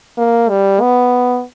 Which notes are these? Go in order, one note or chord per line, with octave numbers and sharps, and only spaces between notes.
A#3
G3
B3